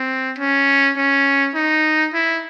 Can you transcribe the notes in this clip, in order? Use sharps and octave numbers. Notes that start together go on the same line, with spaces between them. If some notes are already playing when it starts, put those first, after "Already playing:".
Already playing: C4
C#4
C#4
D#4
E4